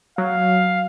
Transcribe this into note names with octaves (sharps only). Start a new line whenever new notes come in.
F#3 F5